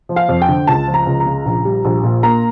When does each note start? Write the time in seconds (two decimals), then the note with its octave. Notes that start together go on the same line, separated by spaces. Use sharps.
0.09 F3
0.16 F5
0.29 F2
0.42 G5
0.49 D3
0.67 C#2 A5
0.87 F3
0.94 A#5
1.07 C#2
1.20 A#5
1.26 C#3
1.46 A#1
1.65 G3
1.85 A#1
2.03 A#2
2.23 A#3 A#5